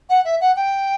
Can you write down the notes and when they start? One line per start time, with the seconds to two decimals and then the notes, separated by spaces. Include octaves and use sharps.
0.09 F#5
0.25 E5
0.41 F#5
0.56 G5